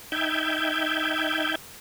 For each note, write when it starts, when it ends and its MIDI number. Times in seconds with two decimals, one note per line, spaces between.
0.12 1.55 63
0.12 1.55 76
0.12 1.55 79
0.12 1.55 91
0.12 1.55 92